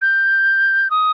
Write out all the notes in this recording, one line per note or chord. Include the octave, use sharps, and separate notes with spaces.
G6
D#6